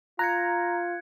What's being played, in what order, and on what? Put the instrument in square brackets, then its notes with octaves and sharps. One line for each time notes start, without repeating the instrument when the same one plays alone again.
[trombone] F4 [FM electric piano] A#5 [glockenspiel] F#6 G#6 C#7